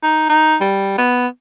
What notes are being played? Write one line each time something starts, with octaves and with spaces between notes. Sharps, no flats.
D#4
D#4
G3
B3